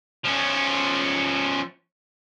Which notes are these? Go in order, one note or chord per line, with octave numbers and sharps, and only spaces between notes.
F3 C#4